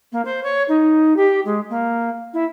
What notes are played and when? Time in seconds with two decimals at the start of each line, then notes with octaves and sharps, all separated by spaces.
0.12 A#3
0.25 C5
0.43 C#5
0.68 D#4
1.16 G4
1.45 G#3
1.69 A#3
2.33 E4